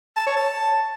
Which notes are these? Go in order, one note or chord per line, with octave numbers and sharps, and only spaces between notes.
A5
C#5
A5